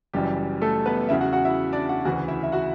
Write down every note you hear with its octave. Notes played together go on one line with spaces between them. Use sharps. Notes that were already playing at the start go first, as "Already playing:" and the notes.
F#1 F#2 E3 G3 G4
A3 A4
B3 B4
E2 C#3 F#3 E4 E5
F#4 F#5
F#4 F#5
E4 E5
D4 D5
F#4 F#5
D2 C#3 E3 F#4 F#5
E4 E5
E5
F#4 F#5